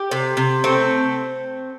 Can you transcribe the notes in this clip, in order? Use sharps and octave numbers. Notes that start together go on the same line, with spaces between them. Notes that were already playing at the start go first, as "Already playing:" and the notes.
Already playing: G4
C3
C3
A3 C4